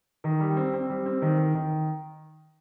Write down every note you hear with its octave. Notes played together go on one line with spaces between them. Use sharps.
D#3
G3
C4
C4
G3
C4
D#3
D#3
D#3